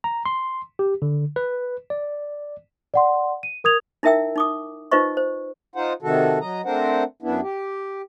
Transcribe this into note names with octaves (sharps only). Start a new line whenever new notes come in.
A#5
C6
G4
D3
B4
D5
D5 F#5 C6
D#7
A#4 D#6 G#6 F7
D#4 E4 A#4 E5 G5 E6
D#4 D6 D#6
D#4 F4 B4 C5 D#5 C#6
C5
D#4 F4 C5 F#5
C3 D#3 F#4 A4
F#3 D#5 A#5
A3 C4 D4 A#4 C5 F#5
F#2 B3 D4 E4
G4